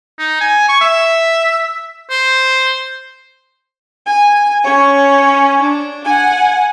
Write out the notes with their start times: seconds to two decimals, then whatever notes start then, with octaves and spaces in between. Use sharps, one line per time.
0.19 D#4
0.41 G#5
0.69 C#6
0.81 E5
2.10 C5
4.06 G#5
4.64 C#4 C#5
5.63 D4
6.05 F#5 G#5